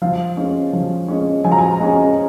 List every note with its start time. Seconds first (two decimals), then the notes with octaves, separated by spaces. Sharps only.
0.02 F3 F5
0.37 G#3 C#4
0.73 F3
1.08 G#3 C#4
1.44 F3 G#5
1.51 A#5
1.58 G#5
1.80 G#3 C#4